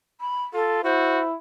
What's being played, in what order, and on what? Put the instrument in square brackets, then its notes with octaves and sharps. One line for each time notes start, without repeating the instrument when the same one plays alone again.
[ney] B5
[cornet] F4 [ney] A4
[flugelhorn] E4 [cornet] F#4 [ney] C5